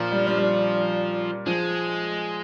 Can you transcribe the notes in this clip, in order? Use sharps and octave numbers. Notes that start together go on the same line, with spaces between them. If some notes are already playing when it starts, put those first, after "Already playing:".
Already playing: A#2 F3
G3
G3
G3
F3 G#3